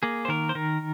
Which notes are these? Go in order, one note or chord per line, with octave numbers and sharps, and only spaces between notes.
A#3 G#4
C5
D#3 A#4
C5
D#3 A#4